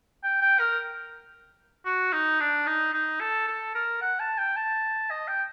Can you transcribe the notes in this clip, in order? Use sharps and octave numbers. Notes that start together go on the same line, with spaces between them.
G5
G5
A#4
F#4
D#4
D4
D#4
D#4
A4
A4
A#4
F#5
A5
G5
A5
D#5
G5